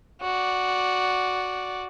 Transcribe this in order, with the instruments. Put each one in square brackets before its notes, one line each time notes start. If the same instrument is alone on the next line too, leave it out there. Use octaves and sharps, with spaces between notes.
[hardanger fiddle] F#4 D5